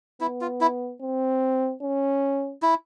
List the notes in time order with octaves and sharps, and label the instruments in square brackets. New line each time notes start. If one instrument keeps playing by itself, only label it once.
[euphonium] B3 [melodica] E4
[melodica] F4
E4
[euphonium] C4
C#4
[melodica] E4